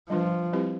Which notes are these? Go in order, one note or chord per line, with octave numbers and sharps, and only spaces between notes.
F3 G3 D4 F4 B4
G3 C4 E4 G4 B4